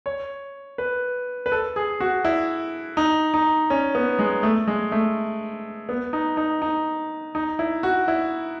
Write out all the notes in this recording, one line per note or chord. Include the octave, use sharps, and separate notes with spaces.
C#5
B4
B4
A4
G#4
F#4
E4
D#4
D#4
C#4
B3
G#3
A3
G#3
A3
B3
D#4
D#4
D#4
D#4
E4
F#4
E4